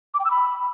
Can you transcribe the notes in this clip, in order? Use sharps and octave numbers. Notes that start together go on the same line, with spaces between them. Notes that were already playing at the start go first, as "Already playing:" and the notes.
D6
G5
E6
B5